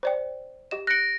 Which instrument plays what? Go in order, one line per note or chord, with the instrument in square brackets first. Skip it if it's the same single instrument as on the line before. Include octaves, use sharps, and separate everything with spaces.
[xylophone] C5 D5 G5
G4 D#5 E7
[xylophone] F#6 C#7 [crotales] A#6 D7